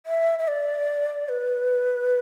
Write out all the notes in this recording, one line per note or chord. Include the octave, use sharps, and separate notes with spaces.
E5
E5
D5
B4